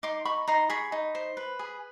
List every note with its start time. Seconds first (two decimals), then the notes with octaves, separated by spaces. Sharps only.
0.03 D#4 C6 D6
0.25 D#4 B5 C#6
0.48 D#4 A#5 C6
0.70 G#4 B5 C#6
0.92 D#4
1.15 C5
1.37 B4
1.59 G#4